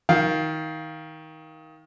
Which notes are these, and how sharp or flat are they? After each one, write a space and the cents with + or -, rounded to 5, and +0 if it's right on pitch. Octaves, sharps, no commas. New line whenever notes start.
D#3 +20 F5 +0